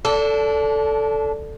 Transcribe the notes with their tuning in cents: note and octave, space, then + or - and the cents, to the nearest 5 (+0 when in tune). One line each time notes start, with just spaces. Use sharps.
D4 -25 A4 +0